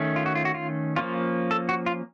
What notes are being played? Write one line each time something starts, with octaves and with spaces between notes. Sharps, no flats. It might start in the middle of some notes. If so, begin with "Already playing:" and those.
Already playing: D#3 A3 C#4
F4
F#4
F4
F#4
F4
F3 A#3 C#4 F4
A4
F#4
F4